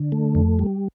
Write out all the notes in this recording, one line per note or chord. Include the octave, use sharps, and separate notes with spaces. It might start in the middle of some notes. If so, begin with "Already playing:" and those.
Already playing: D3
A3
F2
G3